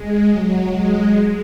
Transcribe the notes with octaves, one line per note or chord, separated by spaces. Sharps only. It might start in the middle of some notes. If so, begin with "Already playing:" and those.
Already playing: G#3
F#3
G#3